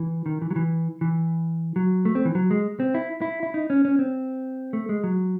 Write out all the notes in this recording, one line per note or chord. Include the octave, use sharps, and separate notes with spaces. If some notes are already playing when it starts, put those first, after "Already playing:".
Already playing: E3
D#3
E3
F#3
E3
E3
F#3
A3
C4
E3
F#3
G#3
C4
E4
E4
E4
D#4
C#4
C#4
C4
A3
G#3
F#3